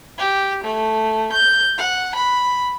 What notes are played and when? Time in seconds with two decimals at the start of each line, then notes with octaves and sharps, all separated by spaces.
0.18 G4
0.64 A3
1.32 G6
1.78 F#5
2.15 B5